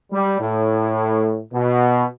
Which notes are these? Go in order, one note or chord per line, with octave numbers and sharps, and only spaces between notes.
G3
A2
B2